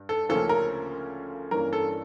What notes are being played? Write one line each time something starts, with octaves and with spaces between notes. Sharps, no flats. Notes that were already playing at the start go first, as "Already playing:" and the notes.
Already playing: G2
A4
D2 C#3 F3 A#3 C#4 A4
A#4
G2 E3 A#3 C#4 A#4
A4